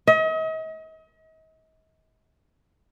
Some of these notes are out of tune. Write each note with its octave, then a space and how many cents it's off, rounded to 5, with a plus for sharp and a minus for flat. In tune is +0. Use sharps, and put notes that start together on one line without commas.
D#5 +40